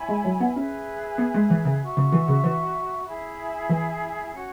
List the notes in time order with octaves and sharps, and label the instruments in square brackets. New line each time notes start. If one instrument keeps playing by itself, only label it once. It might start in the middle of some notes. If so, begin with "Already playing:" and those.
Already playing: [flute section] E4 C#5 G#5 B5
[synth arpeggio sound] G#3
F#3
B3
[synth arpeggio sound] C#4 [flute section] G#4 B4 E5
[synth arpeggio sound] B3
G#3
E3
C#3
[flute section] F#4 E5 C#6
[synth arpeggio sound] C#3
E3
C#3
E3
[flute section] E4 G#4 E5 B5
[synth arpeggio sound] E3
[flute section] C#4 F#4 C#5